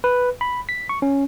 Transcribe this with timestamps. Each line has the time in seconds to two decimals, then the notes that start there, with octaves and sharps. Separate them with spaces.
0.04 B4
0.41 B5
0.69 B6
0.89 C#6
1.02 C#4